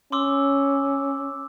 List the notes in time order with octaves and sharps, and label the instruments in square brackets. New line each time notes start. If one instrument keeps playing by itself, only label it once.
[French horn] C#4 [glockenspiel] C6 D6 E6